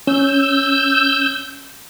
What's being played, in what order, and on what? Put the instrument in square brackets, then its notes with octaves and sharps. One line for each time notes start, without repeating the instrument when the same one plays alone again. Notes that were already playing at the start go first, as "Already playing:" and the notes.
[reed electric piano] C#4 [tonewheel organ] E6 G6